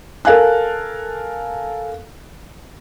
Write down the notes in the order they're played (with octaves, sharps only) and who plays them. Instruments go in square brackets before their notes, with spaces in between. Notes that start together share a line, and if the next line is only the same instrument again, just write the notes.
[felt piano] A4 A#4 F5 G#5 F#6